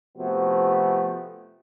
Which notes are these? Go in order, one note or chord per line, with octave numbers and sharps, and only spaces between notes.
C3 F3 A3 B3 F#4